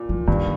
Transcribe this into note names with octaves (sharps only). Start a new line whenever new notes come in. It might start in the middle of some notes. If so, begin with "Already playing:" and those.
Already playing: A#2
F3
G2 D#3